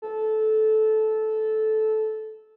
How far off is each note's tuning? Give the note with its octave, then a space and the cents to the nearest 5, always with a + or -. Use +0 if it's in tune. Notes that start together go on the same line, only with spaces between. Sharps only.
A4 -15